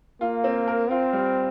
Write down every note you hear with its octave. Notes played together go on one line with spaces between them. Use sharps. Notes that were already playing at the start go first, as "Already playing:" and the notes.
A#3 F4
C4
A#4
C4 F4
G3